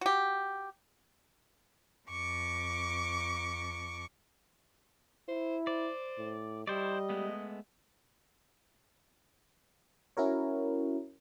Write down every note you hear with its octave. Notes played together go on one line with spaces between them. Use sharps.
F#4 G4
F2 C#6 D6
E4 C5
C5 D5
A2
G3 E4 C5 D5 D#5
G#3 A3 B3
C#4 E4 F#4 A#4 C#5